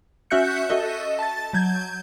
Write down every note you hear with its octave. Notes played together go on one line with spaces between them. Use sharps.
C#4 F#4 E5 F#6 G6 C#7
F#4 A4 D#5 E5
A5 A6
F#3 G6 G#6